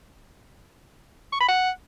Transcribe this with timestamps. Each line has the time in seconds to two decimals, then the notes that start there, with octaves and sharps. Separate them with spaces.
1.33 C#6
1.40 B5
1.48 F#5